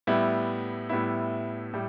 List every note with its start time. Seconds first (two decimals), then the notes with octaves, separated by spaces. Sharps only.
0.07 A2 G3 B3 E4
0.89 A2 G3 B3 E4
1.73 A2 G3